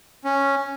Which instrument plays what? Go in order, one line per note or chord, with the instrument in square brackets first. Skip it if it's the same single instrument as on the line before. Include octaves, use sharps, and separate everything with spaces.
[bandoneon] C#4